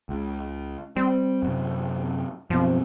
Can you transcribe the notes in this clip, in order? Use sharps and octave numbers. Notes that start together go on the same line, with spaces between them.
C#2
G3 C4
F#2 C3
F#2 B2 F3 C4